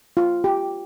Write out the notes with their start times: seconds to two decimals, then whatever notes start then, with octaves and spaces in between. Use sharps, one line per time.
0.17 F4
0.44 G4